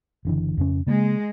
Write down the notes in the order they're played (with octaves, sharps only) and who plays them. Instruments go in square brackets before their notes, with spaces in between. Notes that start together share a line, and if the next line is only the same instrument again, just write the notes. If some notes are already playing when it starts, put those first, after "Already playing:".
[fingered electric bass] F#1 D3 E3
F2 C#3 C#4
[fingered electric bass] C#3 A#3 [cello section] G#3